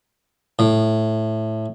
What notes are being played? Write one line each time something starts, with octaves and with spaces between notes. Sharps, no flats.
A2